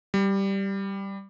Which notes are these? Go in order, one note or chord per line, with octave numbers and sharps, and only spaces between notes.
G3